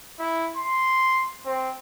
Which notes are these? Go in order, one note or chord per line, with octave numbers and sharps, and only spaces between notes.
E4
C6
C4